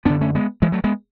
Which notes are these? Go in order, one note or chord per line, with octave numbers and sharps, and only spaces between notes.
F#2 D3 B3 D4
A3 C#4
G#3 B3
E3 G#3
F#3 A3
G#3 B3